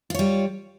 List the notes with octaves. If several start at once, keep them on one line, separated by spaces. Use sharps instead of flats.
G3 F4 C#5